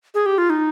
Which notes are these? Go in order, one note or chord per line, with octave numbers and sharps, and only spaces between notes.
G#4
G4
F4
D#4